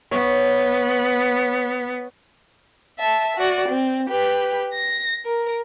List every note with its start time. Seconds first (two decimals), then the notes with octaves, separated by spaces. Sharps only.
0.11 B3 C#5
2.99 E5 A5
3.37 F#4 D5
3.69 C4
4.10 G4 B4
4.74 A#6
5.26 A#4